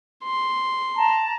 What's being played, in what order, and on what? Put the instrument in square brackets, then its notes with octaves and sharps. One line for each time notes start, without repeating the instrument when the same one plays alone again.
[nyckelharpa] C6
[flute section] A5 A#5